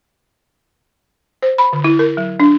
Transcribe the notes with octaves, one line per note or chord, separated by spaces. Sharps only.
C5
B5
D3
E4
A#4
F#3
D4